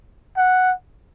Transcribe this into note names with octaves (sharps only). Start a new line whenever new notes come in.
F#5